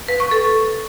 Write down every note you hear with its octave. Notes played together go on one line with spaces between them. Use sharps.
B4
C#6
A4